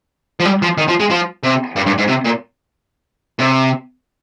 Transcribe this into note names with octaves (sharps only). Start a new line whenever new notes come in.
F3
G3
F3
D#3
F3
G#3
F3
C3
G2
G2
G#2
C3
A#2
C3